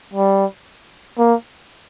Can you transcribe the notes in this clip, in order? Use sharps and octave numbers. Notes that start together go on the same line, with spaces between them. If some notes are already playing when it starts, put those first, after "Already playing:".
G3
A#3